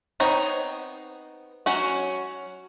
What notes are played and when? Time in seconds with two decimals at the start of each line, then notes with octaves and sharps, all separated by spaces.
0.20 B3 C4 D#4 C#5 A#5
1.66 F#3 C#4 F#4